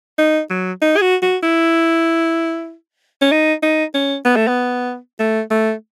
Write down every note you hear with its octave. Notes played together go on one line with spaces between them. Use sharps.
D#4
F#3
D#4
G#4
F#4
F#4
E4
C#4
D#4
D#4
C#4
B3
A3
B3
A3
A3